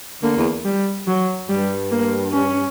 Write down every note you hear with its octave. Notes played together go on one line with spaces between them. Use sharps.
D3 A#3
E2
G3
F#3
G2 G3
A#3
C#4